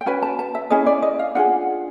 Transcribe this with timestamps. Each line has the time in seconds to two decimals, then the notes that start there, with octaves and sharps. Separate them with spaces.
0.01 G5
0.06 C#4 F#4 B4 G#5
0.22 A5
0.39 A5
0.55 E5
0.70 C#4 E4 G#4 D#5
0.86 D5
1.02 D#5
1.19 F5
1.35 D4 F4 G#4 F#5